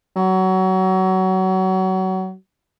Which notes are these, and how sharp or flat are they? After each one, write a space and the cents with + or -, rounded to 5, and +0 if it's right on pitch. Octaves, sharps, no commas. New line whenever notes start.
F#3 +25